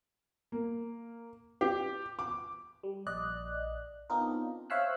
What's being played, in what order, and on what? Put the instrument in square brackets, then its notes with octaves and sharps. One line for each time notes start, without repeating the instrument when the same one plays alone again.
[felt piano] A#3
G4
D6
[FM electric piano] G3
A#1 D5 D#5 F#6
B3 C4 D4 D#4 F4 A#4
C5 C#5 E5 F5 E6 F#6